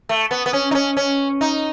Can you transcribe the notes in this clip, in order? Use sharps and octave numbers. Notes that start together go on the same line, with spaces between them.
A3
B3
B3
C#4
D#4
C#4
C#4
D#4